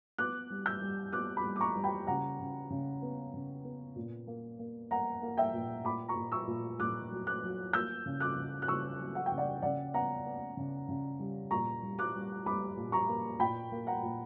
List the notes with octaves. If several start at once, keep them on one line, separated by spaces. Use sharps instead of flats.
B3 D6 F#6
G3
E6 G6
G3
B3 D6 F#6
B5 D6
G3
D6
A#5 C#6
G3
G5 B5
C#3 F#5 A#5
C#3
C#3
B3
C#3
B3
A#2
A#3
A#3
A#3 F#5 A#5
A#3
E5 G5
A#2
A#2 B5 D6
A#5 C#6
A#2
C#6 E6
A#2
A#2 D6 F#6
F#3
D6 F#6
F#3
A#3 E6 G6
C#3
D6 F#6
C#3
F#6
C#3 C#6 E6
F#3
F#5
G5
C#3
D5 F#5
C#3 D5 F#5
B3 F#5 A#5
B3
C#3
C#3
G3
A#2 A#5 C#6
G3
D6 F#6
G3
G3 B5 D6
A#2
A#5 C#6
A#3
A#2 G5 B5
A#3
F#5 A#5
A#2